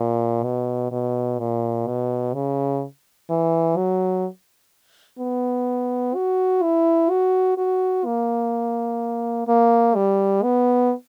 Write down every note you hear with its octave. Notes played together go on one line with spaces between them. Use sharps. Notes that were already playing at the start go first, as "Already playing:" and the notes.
Already playing: A#2
B2
B2
A#2
B2
C#3
E3
F#3
B3
F#4
E4
F#4
F#4
A#3
A#3
G3
B3